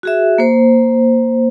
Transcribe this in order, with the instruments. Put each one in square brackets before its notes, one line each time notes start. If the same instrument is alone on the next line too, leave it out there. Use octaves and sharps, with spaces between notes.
[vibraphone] F#4 G#4 E5
A#3 C5